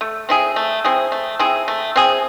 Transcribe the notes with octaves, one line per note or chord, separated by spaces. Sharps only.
A3
C4 E4 G#4
A3
C4 E4 G#4
A3
C4 E4 G#4
A3
C4 E4 G#4